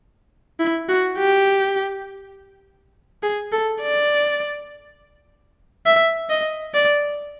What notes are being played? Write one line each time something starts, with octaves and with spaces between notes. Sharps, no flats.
E4
F#4
G4
G#4
A4
D5
E5
D#5
D5